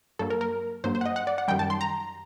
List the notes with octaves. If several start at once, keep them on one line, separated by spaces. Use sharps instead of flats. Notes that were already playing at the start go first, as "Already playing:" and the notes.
G2 F#3 A#3 A4
A#4
A#4
G2 F#3 A#3 C5
C5
F#5
D#5
F#5
D5
F#5
F#2 D#3 G3 G5
A5
C6
A#5